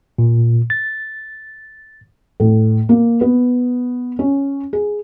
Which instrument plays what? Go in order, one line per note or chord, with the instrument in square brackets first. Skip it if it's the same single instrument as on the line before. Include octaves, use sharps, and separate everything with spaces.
[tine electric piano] A#2
A6
[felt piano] A2
A#3
B3
C#4
G#4